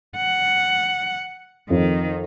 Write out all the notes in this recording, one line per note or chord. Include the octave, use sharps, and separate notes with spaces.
F#5
F2 D#3